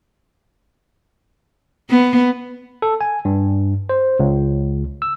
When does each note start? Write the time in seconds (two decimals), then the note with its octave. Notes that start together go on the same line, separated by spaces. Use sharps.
1.90 B3
2.82 A4
3.01 G#5
3.25 G2
3.89 C5
4.20 C#2
5.02 E6